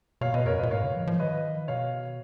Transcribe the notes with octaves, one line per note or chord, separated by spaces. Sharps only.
B2 C#5 F5
B2 B4 D#5
F2 A#4 C#5
B4 D#5
A#2
G#2 C#5 F5
C#3
F3
F3
D#3 B4 D#5
B2 C#5 F5